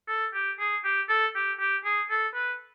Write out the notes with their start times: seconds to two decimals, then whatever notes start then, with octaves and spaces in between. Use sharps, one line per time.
0.08 A4
0.34 G4
0.59 G#4
0.84 G4
1.09 A4
1.35 G4
1.59 G4
1.85 G#4
2.10 A4
2.35 B4